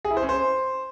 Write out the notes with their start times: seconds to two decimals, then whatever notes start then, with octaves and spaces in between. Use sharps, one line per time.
0.05 G#4
0.11 E4
0.17 C5
0.23 C#4
0.29 C5